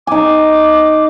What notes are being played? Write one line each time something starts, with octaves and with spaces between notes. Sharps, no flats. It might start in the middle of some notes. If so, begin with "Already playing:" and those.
D#4 G#5 D6